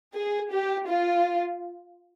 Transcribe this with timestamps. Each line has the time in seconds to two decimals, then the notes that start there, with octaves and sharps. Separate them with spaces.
0.13 G#4
0.50 G4
0.86 F4